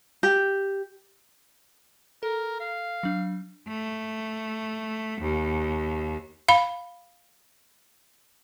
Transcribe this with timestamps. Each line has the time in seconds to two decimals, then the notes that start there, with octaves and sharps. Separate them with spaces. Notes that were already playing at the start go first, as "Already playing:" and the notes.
0.23 G4
2.23 A4 A#4
2.60 F5
3.03 F#3 D4
3.68 A3
5.21 D#2
6.48 F5 B5